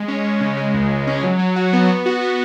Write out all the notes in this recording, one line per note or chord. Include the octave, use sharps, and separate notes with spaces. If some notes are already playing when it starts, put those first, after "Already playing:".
Already playing: G#3
C#4
G#3
C#3
G#3
C#2
C#2
C#4
F#3
F#3
F#4
B3
B3
F#4
B3